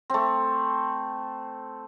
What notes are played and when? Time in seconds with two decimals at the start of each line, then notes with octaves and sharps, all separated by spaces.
0.10 A3 C4